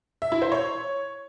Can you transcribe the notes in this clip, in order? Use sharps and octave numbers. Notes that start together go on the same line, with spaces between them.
E5
E4
C5
C#5